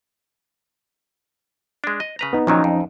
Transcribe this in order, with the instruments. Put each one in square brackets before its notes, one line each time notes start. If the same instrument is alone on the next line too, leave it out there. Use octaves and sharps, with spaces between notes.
[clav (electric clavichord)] G#3 D4
D#5
C#3 B4 A#5
[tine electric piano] B3 D#4
[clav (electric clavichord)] A#2 D#3 F#3 [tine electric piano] F3 C#4 D#4
[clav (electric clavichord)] F2